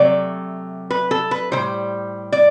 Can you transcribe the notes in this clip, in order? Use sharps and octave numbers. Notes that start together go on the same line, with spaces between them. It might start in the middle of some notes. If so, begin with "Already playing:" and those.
Already playing: C3 F#3 A3 D5
B4
A4
B4
A2 E3 G3 C5
D5